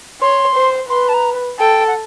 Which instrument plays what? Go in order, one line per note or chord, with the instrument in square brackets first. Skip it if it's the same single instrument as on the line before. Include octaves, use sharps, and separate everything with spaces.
[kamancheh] C#5 [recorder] C6
[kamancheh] C5
[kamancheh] B4 [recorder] C6
[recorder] A5
A#5
[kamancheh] A4 [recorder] G5
[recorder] F#5